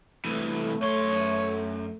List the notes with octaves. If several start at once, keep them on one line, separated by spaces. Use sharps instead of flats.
C2 E3 A3
F#2 C#5 C6